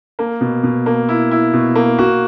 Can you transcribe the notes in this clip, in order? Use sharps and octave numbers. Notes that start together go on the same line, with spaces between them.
A#3
B2
B2
A#3
E4
E4
B2
A#3
F#4